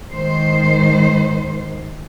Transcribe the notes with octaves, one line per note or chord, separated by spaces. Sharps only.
G#2 D#3 C5